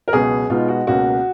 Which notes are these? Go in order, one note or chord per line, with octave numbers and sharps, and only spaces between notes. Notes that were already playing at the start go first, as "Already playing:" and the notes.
A#4
C#2 B2 F#3 B3 G#4
B2 G#3 B3 D#4 F4
F#4
C#2 B2 A#3 C#4 F#4